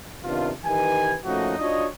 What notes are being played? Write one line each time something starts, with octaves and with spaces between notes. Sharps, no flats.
C3 D#3 B3 D4 F4
D#3 E3 G4 B4 G#5
F3 A3 A#3 C#4 D#4 F#4
D4 D#4 F4 F#4 C#5 D#5